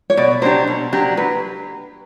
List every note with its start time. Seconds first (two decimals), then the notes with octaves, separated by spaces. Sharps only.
0.10 C#5
0.17 B2 D5
0.42 F#3 A#3 D4 G4 C5
0.67 B2
0.93 F#3 A#3 D4 G4
1.17 F#3 B4